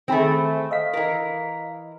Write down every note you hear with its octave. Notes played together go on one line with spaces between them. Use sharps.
D#3 A3 C4 G#4 B5
D#5 F5 B6
E3 A#4